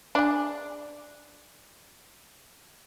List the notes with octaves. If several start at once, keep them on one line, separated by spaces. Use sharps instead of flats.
D4 G#4